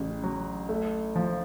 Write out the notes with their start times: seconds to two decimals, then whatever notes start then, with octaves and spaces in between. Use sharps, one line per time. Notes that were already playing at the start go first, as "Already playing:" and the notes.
Already playing: A1 C#3
0.23 F#3
0.69 A3
1.15 F3